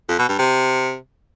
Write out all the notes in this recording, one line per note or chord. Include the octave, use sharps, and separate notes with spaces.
F2
B2
G2
C3